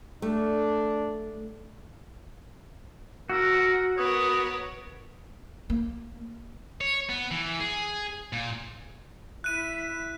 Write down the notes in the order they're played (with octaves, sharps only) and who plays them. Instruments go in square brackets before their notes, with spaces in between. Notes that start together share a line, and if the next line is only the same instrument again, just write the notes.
[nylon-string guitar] A3 [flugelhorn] D4
[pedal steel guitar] F#4 [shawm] A#4 [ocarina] E6
[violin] B3 A#4 [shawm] C#5 [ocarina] D#6
[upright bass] A#3
[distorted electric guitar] C#5
B3
E3
G#4
A#2
[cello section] E4 E5 [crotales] F#6 D#7